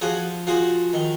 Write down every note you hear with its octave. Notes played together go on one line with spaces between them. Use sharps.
F3 F#4 G#4
F3 F#4 G#4
D#3